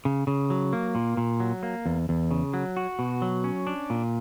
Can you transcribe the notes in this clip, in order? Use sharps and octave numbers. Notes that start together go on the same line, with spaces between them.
C#3
C#3
F#3
A#3
A#2
A#2
F#3
A#3
E2
E2
C#3
F#3
F#4
B2
F#3
C#4
D4
A#2